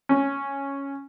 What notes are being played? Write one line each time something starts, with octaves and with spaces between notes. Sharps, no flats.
C#4